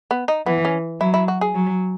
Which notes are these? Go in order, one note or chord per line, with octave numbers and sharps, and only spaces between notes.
B3
D#4
E3 B3
C#4
F#3 E4
E4
F#4
G#4
F#3